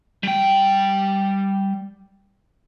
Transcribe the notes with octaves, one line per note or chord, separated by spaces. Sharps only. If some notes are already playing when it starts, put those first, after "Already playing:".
G3 G5